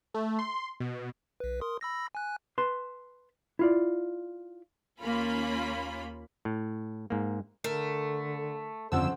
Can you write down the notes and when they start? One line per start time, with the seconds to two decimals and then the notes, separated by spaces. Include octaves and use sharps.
0.14 A3
0.39 C6
0.80 B2
1.40 B1 B4
1.61 A#4 C6 D#6
1.81 B5 E6 A#6
2.15 G#5 F#6
2.58 B4 A5 C6
3.59 E4 F4 D5
4.99 D#2 A#3 C#4 F4 B5
6.45 A2
7.10 G#2 A#3
7.64 D3 A3 A#4
8.92 G1 F2 C#3 C5 F#5 A5 E6